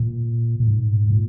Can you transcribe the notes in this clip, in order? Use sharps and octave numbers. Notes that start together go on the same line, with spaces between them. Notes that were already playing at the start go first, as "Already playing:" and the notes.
Already playing: A#2
A#2
G#2
A#2